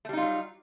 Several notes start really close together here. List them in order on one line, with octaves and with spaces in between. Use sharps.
A3 G3 D#4 F4 F#3